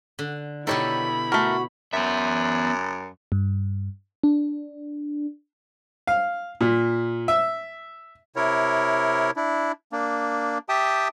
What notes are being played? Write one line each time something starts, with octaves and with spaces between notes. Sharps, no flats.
D3
B2 D#3 E4 G4 A4 C#5 B5
A3 F#4 A#4
F#2 B3 E5
G2
D4
F5
A#2
E5
C3 E4 A#4 C#5
D4 E4
A#3 D4
G4 E5 G5 A5 D#6